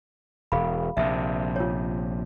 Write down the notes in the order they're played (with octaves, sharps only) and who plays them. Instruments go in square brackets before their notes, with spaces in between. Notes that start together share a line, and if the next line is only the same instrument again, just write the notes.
[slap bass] E1 [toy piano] G#4 F5 B5
[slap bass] A#1 C3 [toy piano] E5
[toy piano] F4 C#5